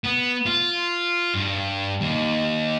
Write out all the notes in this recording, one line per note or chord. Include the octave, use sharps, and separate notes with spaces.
B3
F4
G2
D#2